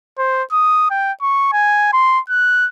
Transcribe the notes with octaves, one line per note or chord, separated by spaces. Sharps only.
C5
D#6
G5
C#6
G#5
C6
F#6